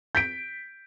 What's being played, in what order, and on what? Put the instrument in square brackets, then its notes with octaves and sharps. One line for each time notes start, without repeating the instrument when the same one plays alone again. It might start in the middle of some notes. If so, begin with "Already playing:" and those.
[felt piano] G6 B6 D7